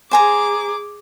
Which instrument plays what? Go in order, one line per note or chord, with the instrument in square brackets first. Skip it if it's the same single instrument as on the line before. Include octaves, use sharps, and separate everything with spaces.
[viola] G#4 D6 [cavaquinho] C5 G#5 A#5